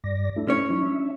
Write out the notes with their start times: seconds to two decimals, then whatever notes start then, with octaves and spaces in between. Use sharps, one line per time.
0.04 G2 D5 A#6
0.36 A3 D4 E4
0.48 C#4 C#5
0.70 F#3 D#4 E4
0.83 D4 E5